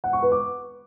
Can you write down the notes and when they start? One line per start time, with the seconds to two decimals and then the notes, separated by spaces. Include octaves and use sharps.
0.04 F#5
0.13 C#6
0.22 B4
0.32 D6